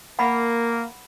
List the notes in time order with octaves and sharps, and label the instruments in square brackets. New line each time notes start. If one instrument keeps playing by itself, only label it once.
[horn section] A#3 [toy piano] F#5 B5